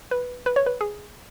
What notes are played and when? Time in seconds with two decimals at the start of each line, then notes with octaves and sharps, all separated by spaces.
0.11 B4
0.46 B4
0.56 C#5
0.66 B4
0.81 G#4